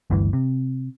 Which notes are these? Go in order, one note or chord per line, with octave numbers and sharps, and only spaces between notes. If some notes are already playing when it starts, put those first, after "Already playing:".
G1 D2 G2 E3
C3